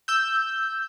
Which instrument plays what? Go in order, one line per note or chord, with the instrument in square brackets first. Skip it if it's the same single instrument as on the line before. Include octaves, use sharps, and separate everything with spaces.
[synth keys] E6 G6